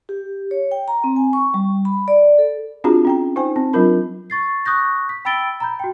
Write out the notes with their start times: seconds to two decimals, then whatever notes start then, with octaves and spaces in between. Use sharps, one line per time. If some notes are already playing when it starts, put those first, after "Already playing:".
0.09 G4
0.51 C#5
0.71 G5
0.88 A#5
1.04 C4
1.16 G#5
1.33 C#6
1.54 G3
1.85 B5
2.08 D5
2.38 A4
2.84 C4 D4 F4 F#4 G#4 A#5
3.05 C#4 G5 A#5
3.36 D#4 C5 G5 G#5
3.56 C4
3.73 F#3 D4 F4 A#4 B5
4.30 C#6 A6 C7
4.65 C#6 D#6 F#6 G6 A#6
5.09 B6
5.25 G5 B5 E6 A6 D7 G7
5.60 A#5 B5 G6
5.79 F#4 G5